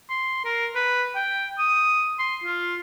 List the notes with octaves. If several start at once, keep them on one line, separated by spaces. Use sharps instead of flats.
C6
A#4
B4
G5
D#6
C6
F4